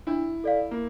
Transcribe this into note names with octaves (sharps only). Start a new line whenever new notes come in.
D4 E4
A4 D5 F5
A#3